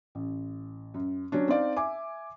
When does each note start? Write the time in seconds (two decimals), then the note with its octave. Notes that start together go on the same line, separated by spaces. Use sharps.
0.15 A1
0.94 F#2
1.32 F#3 C#4 D4
1.48 C4 D#4 D5 F5
1.76 E5 G#5 D6